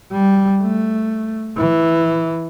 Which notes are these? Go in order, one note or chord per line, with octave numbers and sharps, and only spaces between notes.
G3
A3
E3